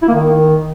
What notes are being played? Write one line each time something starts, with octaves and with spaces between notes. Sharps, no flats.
E4
A#3
D#3